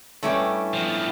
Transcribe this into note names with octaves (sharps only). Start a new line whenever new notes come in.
G2 A3 C#4 E4 D5 G5
F3 B3